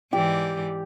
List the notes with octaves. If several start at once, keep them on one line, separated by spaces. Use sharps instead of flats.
G#2 E3 G4 D5